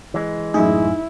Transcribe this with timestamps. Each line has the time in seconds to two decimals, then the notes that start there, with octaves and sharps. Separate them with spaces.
0.14 E3 G#3
0.54 F#2 A2 D#4 E4 G#4